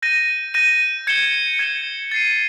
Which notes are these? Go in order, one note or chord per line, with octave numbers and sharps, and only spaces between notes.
G6 A#6 D#7
G6 A#6 D#7
G#6 C#7 E7 G7
G#6 C#7 E7 G7
A6 C7 D#7